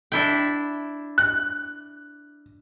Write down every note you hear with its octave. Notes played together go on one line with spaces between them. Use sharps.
D4 E4 G5
F#6